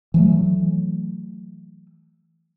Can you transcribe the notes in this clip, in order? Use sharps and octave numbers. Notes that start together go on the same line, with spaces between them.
E3 F#3 A3